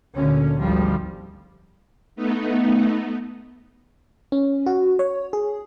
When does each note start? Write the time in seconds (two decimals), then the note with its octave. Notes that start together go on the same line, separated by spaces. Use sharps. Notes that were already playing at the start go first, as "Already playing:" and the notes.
0.13 D2 A#2 D3 C#4
0.60 G#1 D2 G#2 F3 G3
2.16 A3 B3 D#4
4.32 C#4
4.66 F#4
4.99 C#5
5.33 G#4